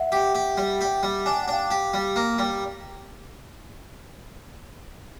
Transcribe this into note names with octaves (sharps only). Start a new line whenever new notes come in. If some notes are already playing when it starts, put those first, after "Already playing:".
Already playing: E5 F#5
G4
G4
G3
G4
G3
D4 G#5
G5
F#5
D4 F5 G5
G4
G3
A#3
G3